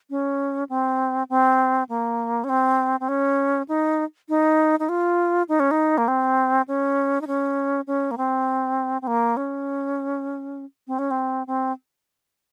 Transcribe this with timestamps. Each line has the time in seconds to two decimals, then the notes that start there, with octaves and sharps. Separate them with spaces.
0.10 C#4
0.69 C4
1.30 C4
1.89 A#3
2.44 C#4
2.49 C4
3.00 C4
3.08 C#4
3.68 D#4
4.29 D#4
4.79 D#4
4.89 F4
5.49 D#4
5.60 C#4
5.71 D#4
5.98 A#3
6.08 C4
6.68 C#4
7.21 D#4
7.27 C#4
7.87 C#4
8.11 A#3
8.17 C4
9.02 C4
9.07 A#3
9.37 C#4
10.87 C4
10.99 C#4
11.11 C4
11.47 C4